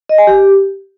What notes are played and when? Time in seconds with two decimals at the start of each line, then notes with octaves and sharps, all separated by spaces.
0.09 D#5
0.18 G#5
0.27 G4